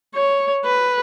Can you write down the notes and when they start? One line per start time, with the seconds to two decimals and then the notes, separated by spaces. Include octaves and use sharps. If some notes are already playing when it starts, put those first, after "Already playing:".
0.15 C#5
0.65 B4